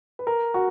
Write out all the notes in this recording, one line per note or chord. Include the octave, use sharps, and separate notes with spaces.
B4
A#4
F#4